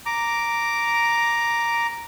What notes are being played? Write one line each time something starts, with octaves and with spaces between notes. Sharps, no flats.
A#5 D6